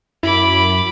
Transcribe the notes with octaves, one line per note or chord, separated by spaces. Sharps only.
F#2 E4 B5 D6